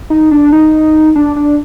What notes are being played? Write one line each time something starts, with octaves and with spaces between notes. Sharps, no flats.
D#4
D4
D#4
D4
D4